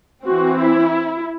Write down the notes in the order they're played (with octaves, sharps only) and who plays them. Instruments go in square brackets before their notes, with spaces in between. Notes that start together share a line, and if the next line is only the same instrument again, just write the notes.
[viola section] E3 C4 F#4
E4